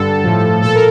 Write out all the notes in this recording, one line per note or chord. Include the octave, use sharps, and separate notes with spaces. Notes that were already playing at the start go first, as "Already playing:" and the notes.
Already playing: G2 D3 G3 A4
A2 F3
A#2 F3 A4
A#4